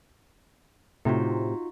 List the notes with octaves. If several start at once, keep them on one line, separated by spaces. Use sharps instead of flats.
A2 C3 D#4 F4 F#4